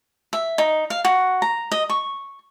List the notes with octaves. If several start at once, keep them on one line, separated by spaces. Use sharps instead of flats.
E5
D#4
F5
F#4
A#5
D#5
C#6